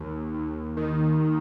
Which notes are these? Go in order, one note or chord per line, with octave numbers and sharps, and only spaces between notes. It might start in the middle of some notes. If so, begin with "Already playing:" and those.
Already playing: D#2
D#2
D#3